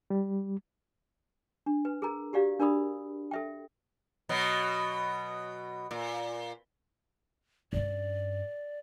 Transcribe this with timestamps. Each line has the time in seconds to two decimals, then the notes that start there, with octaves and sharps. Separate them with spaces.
0.10 G3
1.66 D4
1.85 B4
2.02 G#4 A#4 A#5
2.33 F#4 G4 D5 F5
2.60 D4 A#4 D5 B5 D#6
3.31 A4 E5 G5
4.29 B2 F#3
5.91 A#2
7.73 G2 C#4 D5